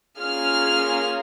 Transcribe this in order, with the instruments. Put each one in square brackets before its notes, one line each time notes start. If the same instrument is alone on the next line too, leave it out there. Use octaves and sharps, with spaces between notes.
[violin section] A#3 C#4 F4 G#4 F6